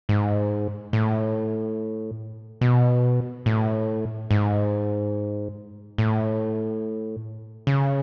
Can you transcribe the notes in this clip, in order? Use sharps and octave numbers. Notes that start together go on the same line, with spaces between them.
G#2
A2
B2
A2
G#2
A2
C#3